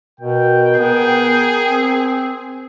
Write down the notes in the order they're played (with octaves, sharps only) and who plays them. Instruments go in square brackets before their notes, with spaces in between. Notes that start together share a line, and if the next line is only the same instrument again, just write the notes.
[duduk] B2 [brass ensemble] A#4 G5
[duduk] B3 [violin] G#4
[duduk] C4